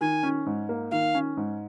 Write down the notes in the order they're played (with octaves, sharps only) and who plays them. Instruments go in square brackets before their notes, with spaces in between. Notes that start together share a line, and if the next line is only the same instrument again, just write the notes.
[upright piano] D#3 [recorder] G#5
[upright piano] C#4
G#2
A#3
[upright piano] D#3 [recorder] F5
[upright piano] C#4
G#2